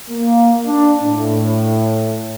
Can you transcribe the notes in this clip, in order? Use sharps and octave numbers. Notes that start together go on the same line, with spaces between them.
A#3
D4
A2